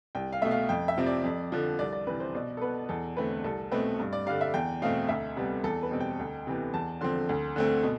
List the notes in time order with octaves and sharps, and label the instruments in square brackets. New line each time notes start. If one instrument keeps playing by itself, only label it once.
[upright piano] C2 G5
F5
B2 A3 E5
F5
F2 G5
E5
C3 F3 C4
D5
F2
D3 F3
C2 D5
D5
C3 E3 B4
C5
B2 D5
A4
B3 B4
E2 A4
D3 A3 C4 B4
C2 A4
B2 A3 C4 B4
G2
D5
D3 G3 F5
E5
E2 G5
B2 A3 C4 F5
D2 E5
C3 G3 B3
E2 A4
B4
B2 G3 C4
G5
D2
C3 E3 B3
E2 A5
D3 F3 C4 C6
D2
D3 A3 C4
B2